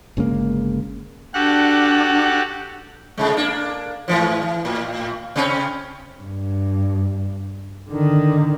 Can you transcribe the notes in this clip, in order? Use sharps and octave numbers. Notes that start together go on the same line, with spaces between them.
G1 C#3 G#3 A#3
D4 F#4 G4 A4 F#5
A2 C3 G#3
A#3 D4
G#2 E3 F3
E3
A2
C3 C4 C#4
G2
D3 D#3